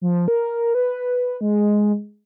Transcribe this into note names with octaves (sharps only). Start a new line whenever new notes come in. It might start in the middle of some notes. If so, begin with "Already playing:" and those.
F3
A#4
B4
G#3